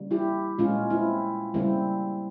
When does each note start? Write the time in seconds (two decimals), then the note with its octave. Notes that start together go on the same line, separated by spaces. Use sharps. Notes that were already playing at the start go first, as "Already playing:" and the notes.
Already playing: C#3 G3 A#3
0.11 E4 G4
0.58 A#2 G#3 C#4 F4
0.90 C4 E4
1.54 C#3 G3 A#3 C4 E4